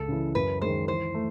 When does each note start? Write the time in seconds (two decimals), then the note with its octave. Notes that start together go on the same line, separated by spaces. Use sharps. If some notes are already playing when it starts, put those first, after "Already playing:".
Already playing: C#2 A4
0.08 C#3 E3
0.35 F#2 B4
0.62 D#3 G#3 C5
0.88 E3 C5
1.14 A3